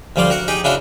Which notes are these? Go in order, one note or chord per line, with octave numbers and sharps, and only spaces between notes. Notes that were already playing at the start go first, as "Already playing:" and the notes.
D2 F3 G3 D5 F5 C6
F#4 A#4 F#5
D#4 G4 G#4 D#5
C#3 D4 E4 F#4 A#4 C6